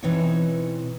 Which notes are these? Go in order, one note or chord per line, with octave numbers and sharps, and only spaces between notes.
B2 E3 C4 D#4 B4 C#5